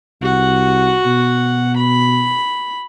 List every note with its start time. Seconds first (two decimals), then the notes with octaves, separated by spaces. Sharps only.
0.22 C2 F#4 F#5
1.06 B2
1.76 B5